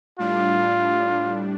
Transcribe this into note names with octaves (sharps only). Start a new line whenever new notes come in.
A2 G3 D4 F4